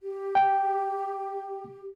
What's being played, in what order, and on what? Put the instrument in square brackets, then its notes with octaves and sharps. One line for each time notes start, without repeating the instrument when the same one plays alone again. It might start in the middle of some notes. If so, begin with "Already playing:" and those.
[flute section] G4
[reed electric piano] G5